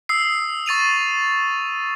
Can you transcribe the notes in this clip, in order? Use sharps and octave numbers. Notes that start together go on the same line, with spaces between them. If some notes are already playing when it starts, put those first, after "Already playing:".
D#6 E6 C7
C#6 A6 D#7 F7